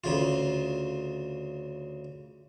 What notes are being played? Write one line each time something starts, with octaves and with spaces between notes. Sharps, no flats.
D2 C#3 F4